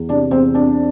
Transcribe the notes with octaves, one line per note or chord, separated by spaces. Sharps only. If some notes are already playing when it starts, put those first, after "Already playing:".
Already playing: E2
C3 D4 D5
E2 C4 C5
C4 D4 D5